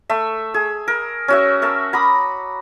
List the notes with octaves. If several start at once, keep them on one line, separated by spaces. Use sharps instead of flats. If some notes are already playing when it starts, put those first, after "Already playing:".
A3 E5
G#4
A#4
C#4 F#4 E5
A#4 E5 A5
A#5 B5 D6 D#6